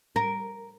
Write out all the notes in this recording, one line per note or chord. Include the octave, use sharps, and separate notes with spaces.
A#4